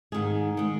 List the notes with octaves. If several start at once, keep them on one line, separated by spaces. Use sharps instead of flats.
G#2 D#3 G#3 G#4
D#3 G#3